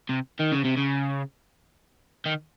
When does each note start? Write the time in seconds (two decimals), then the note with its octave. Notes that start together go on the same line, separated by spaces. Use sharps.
0.09 C3
0.40 D#3
0.52 C#3
0.65 C3
0.77 C#3
2.26 D#3